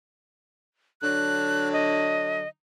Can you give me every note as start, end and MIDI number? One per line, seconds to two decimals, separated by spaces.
1.01 2.43 50
1.01 2.43 54
1.01 2.43 62
1.01 1.69 90
1.73 2.48 75